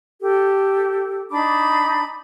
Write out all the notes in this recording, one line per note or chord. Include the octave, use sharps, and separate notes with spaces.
G4 A4
D4 D#4 B5 D6